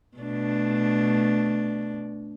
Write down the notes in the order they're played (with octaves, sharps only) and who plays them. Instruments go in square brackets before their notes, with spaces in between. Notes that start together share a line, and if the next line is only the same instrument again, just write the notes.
[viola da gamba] B2 A3 D4